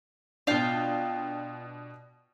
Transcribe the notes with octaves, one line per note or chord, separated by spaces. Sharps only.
B2 D4 F4 F5 G5